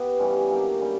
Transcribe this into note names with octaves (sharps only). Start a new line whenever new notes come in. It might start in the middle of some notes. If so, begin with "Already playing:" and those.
Already playing: B3 E4 G4
C#3 E3 G3 C#4
F#3 A#3 D4 G4
C#3 G3